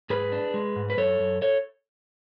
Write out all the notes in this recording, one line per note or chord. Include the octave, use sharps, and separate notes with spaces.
G#2 G#4 B4
D4
G#3
G#2
B4
F#2 A4 C#5
F#2
A4 C#5